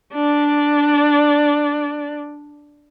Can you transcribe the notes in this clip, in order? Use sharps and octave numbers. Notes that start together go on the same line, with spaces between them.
D4 D5